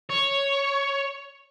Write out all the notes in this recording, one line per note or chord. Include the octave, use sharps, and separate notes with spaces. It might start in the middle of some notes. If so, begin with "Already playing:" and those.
C#5